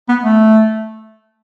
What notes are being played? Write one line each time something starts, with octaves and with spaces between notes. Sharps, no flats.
B3
A3